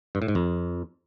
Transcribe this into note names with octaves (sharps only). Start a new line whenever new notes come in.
G2
A2
G#2
F2